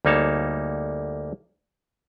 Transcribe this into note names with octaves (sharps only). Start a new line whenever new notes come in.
D2 G3 A#3 D#4 C#5 A5